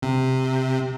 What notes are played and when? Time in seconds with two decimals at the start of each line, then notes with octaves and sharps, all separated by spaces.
0.02 C3